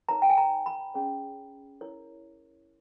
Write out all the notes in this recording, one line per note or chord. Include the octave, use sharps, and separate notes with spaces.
D#4 A#4 C#5 A#5
G5
G#5
A#5
B5
C#4 G#4 C#5
E4 A#4 C#5